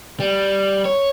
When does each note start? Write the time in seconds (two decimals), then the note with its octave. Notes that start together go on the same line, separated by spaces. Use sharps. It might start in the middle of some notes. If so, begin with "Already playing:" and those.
0.20 G3
0.85 C#5